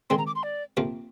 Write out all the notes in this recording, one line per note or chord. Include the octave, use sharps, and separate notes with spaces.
D#3 G#3 C4 C6
A#5
D6
C6
D5
C3 F3 A#3 F4